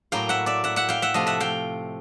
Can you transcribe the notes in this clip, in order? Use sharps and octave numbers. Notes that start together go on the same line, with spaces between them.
A2 F#3 A#3 F5 G5
E5 F#5
D5 E5
E5 F#5
E5 F#5
F5 G5
E5 F#5
C3 F3 A3 D#5 F5
E5 F#5
F5 G5